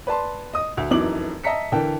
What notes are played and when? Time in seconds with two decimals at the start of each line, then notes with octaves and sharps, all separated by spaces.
0.07 B4 D5 A5 C6
0.53 D#5 D#6
0.77 D2
0.91 F1 F#2 E3 D#4 D6 F#7
1.44 D#5 E5 A5 A#5 B6 C#7
1.72 D3 E3 A#4 G5 A5